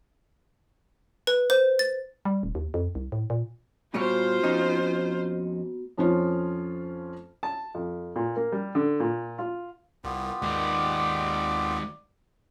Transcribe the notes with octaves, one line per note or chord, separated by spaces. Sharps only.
B4
C5
A6
G3
D#1
D#2
F2
C2
A2
A#2
A#2 G3 A#3 B3 F4 F#4 C5 C#5
F2 C#4 D#4
F2 F3 C#4 F4
A5
F2
A#2
A#3
G3
D3
A#2
F4
C2 B3 F4 G4
D#2 D#3 G#3 D5